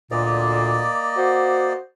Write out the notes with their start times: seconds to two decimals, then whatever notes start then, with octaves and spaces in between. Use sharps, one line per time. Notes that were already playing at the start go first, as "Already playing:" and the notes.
0.11 D2 A#2 A#3 D5 D#5
1.17 F#4 C5